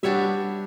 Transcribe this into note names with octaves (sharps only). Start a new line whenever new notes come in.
G3 B3 D4 G4 C#5 E5